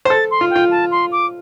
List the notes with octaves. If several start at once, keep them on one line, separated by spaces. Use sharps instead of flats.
C5
A4 A6
C6
F4
G5
F4
A5
C6
D6